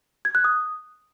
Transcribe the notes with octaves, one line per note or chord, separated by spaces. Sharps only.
G#6
F#6
D#6